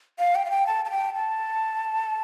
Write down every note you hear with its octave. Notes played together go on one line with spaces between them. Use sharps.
F5
G5
F5
G5
A5
A5
G5
A5